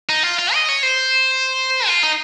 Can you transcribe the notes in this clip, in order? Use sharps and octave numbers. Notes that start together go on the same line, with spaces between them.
D#4
F4
F4
D#5
C#5
C5
F4
D#4